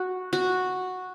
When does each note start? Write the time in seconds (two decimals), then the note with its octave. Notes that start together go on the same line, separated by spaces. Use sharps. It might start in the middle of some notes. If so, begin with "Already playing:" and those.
Already playing: F#4
0.33 F#4